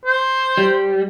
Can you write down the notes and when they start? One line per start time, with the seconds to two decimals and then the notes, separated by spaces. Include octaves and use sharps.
0.06 C5
0.58 G3